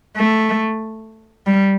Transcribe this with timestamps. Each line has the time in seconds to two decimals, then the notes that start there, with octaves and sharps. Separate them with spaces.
0.17 A3
1.47 G3